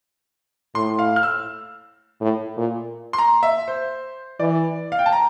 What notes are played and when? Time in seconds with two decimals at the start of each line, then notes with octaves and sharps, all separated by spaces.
0.75 A2 C6
0.99 F5
1.16 F6
1.23 E6
2.21 A2
2.57 A#2
3.13 C6
3.18 A#5
3.43 E5
3.68 C5
4.40 E3 D5
4.92 F5
4.99 G5
5.06 A5
5.13 A#5